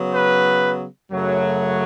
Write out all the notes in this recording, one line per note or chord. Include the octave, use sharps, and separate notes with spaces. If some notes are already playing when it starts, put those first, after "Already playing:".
Already playing: C#3 F#3 B3
B4
F#2 C#3 F#3 A3